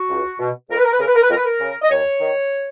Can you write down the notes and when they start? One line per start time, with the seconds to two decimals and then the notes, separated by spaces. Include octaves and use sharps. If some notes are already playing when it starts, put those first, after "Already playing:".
Already playing: F#4
0.10 C#2
0.39 B2
0.70 F2 A#4
0.78 B4
0.84 A#4
0.92 B4
0.99 C#3 A#4
1.08 B4
1.15 A#4
1.22 B4
1.30 F2 A#4
1.37 B4
1.45 A#4
1.60 C#3
1.82 D#5
1.90 D#2 C#5
2.20 D#3